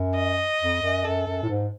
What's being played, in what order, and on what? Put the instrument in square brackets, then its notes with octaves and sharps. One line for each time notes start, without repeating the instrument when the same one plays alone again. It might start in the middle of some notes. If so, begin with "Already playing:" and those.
Already playing: [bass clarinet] F#2
[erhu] D#5
[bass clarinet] F2
F#2
[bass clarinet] F#2 [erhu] A4
[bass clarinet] F#2
A2
G#2